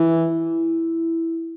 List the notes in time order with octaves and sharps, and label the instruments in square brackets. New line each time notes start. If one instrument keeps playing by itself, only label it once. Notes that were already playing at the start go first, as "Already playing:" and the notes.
Already playing: [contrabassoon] E3 [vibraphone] E4